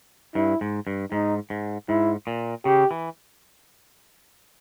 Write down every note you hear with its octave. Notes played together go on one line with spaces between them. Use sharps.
G2 E4
G#2
G2
G#2 D#4
G#2
G#2 E4
A#2
C#3 G4
E3